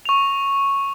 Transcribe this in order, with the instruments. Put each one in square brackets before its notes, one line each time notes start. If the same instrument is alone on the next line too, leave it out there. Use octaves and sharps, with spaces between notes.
[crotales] C#6 F7